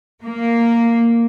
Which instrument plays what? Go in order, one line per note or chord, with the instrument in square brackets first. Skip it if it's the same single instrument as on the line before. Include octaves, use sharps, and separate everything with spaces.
[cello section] A#3